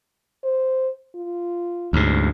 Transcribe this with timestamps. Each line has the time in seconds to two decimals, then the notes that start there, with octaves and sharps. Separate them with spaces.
0.43 C5
1.15 F4
1.93 D2 G#2